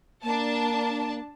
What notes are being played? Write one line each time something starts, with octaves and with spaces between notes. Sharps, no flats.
A#3 D4 A5